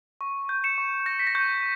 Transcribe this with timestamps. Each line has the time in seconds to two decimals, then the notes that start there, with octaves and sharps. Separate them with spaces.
0.21 C#6
0.49 G6
0.64 C#7 E7
0.78 C#6
1.06 G6 A#6
1.19 B6
1.27 A#6
1.35 C#6 G6